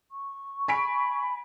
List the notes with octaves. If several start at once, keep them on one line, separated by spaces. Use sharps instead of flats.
C#6
G#5 B5 B6 D7